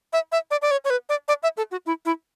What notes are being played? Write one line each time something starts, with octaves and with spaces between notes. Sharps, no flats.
E5
E5
D5
D5
C#5
C#5
B4
D5
D5
E5
A4
F#4
E4
E4